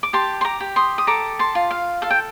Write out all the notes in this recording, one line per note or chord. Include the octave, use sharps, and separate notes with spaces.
D6
G4 A5 C6
C6
A#5 D6
G4
C6 D#6
D#6
A4 A#5 D6
A5 C6
F4
F5
A4 F5
G5